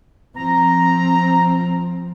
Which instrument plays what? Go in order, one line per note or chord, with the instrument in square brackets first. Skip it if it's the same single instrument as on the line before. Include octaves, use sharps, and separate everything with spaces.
[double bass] F3 C4 [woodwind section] A#5